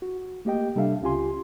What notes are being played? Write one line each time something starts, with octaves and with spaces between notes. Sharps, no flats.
F#4
A3 A#3 G4 D#5 G5
C3 G3 D4 A4 E5 F5
C#2 C#4 F4 G4 G#5 C6